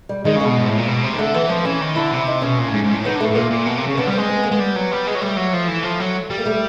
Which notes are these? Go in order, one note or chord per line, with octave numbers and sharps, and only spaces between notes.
G3
D#3 G#3
C#3
B2 G#3
G#2
A2
A#2
B2
C3
D#3
D3 A3
E3 B3
F3 C4
E3 C#4
D#3
D3 E4
C3
D#4
B2 C#4
A#2
A2
G#2
G#2
A2
D#3 B3
D3
A2 A3
A2
A#2 A#3
A#2
B2
C3
C#3
D3 B3
G3
C4
G#3
C4
B3
A#3
G#3 B3
G3
F#3
G3
G#3
F#3
G3 A3
F#3
F3
E3
F3
F#3
G3
A#3
A3